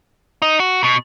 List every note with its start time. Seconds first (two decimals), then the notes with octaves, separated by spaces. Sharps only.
0.42 D#4
0.60 F#4
0.84 B2